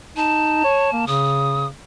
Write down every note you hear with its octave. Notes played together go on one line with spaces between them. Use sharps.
D#4 A5
C#5
A#3
C#3 D#6